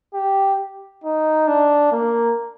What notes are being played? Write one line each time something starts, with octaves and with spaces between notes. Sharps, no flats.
G4
D#4
D4
A#3